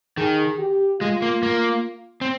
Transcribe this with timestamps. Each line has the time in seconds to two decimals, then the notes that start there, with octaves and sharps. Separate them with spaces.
0.17 D#3 G#4
0.58 G4
1.00 G#3 F4
1.22 A#3
1.43 A#3
2.21 C4